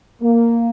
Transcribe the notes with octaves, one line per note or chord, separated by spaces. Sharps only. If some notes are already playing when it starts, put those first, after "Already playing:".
A#3